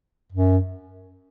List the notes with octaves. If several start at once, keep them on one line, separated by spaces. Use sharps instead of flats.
F#2